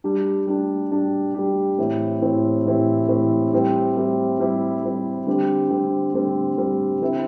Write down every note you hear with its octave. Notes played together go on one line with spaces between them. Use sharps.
G3 D4 G4
G3 D4 G4
G3 D4 G4
G3 D4 G4
A2 E3 C4 E4 G4
A2 E3 C4 E4 G4
A2 E3 C4 E4 G4
A2 E3 C4 E4 G4
G3 C4 E4 G4
G3 C4 E4 G4
G3 C4 E4 G4
G3 C4 E4 G4
D3 G3 C4 G4
D3 G3 C4 G4
D3 G3 C4 G4
D3 G3 C4 G4
D3 C4 E4